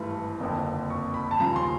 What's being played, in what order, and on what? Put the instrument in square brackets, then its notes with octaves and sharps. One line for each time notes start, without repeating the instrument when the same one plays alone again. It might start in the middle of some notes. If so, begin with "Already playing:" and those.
Already playing: [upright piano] G#1 G2 E3 A3
F#1 F2 D3
C#6
B5
A5
D#2 C#3 F3 A#5
C6